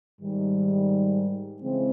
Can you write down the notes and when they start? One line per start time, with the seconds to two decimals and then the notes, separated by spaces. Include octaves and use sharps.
0.21 G#2 D#3 G3
1.62 C#3 E3 G#3 C4